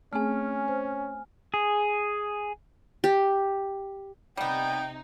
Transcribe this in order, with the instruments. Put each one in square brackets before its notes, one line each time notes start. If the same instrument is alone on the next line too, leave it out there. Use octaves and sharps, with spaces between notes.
[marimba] A3 C4 G#4 [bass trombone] C#4 [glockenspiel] G#5 F6
[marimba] C5
[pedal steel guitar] G#4
[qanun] G4
[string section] C3 D#4 [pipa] G3 B3 [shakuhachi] G5